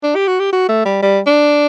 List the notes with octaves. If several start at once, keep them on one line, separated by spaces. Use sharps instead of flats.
D4
G4
F#4
G4
F#4
A3
G3
G3
D4